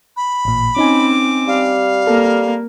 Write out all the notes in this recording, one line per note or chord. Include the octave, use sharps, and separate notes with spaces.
B5
A1 A#2
C4 C#4 D#4 G#5 D6
G3 F5
A#3 A4